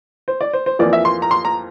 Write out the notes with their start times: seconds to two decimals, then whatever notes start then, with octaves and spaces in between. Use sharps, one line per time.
0.28 C5
0.41 D5
0.53 C5
0.66 C5
0.79 F2 E3 A#3 F4 D5
0.93 E5
1.05 C6
1.22 A#5
1.31 C6
1.45 A#5